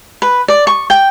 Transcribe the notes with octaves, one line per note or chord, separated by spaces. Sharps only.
B4
D5
C#6
G5